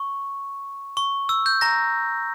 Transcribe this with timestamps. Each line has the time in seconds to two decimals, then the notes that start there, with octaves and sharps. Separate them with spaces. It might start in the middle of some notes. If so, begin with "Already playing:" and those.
Already playing: C#6
0.97 C#6
1.29 E6
1.46 G6
1.61 A#5 A#6